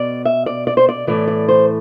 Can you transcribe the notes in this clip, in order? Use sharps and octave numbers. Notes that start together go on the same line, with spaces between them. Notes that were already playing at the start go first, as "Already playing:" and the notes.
Already playing: B2 D5
E5
D5
D5
C5
D5
A2 E3 D5
D5
C5